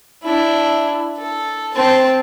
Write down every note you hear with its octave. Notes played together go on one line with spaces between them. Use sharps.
D4 E4
A4
C4 A5